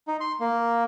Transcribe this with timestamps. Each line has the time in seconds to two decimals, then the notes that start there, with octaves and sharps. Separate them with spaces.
0.08 D#4
0.20 C6
0.40 A#3